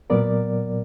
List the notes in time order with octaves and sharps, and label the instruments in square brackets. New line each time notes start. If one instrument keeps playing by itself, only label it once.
[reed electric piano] A#2 F#3 B3 A#4 D5